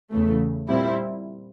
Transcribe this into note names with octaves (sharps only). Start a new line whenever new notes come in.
E2 C#3 E3 A3
A#2 G3 C4 E4